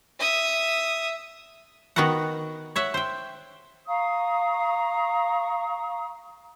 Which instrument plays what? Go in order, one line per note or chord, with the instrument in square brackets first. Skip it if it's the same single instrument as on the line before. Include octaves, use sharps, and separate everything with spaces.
[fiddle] E5 D#6
[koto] D#3 B3 F#4 A#4 F#5
C#5 E5 F#5
C5 G5
[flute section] F5 A#5 C#6 D#6